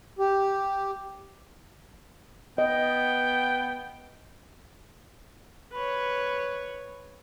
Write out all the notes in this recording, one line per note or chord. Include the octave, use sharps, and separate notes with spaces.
G4
B3 D#5 G5
B4 C#5